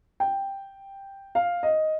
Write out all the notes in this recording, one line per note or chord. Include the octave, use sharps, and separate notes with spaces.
G5
F5
D#5